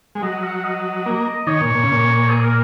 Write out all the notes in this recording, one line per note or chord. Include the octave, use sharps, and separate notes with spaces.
G#3
F#3 D#5
F#5
F#5
D#5
A#3
D#3 C#5
A#2
A#2
C#3
A#2
G#4
A#4